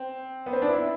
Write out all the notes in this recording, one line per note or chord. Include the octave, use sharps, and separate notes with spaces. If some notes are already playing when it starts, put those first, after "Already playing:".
Already playing: C4
B3
C4
D4
E4